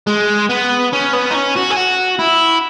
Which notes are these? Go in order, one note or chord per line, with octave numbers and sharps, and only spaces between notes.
G#3
B3
C#4
B3
D#4
C#4
F#4
G#4
F#4
E4